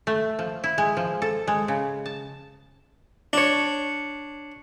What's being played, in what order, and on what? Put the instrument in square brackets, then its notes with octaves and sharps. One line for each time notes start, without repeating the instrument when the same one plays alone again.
[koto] A3
F3
E4
G#3
F3
A4
G#3
C#3
A5
[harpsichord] D4 C#5